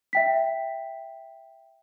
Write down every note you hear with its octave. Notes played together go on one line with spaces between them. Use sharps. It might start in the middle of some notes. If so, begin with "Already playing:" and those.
E5 G5 B6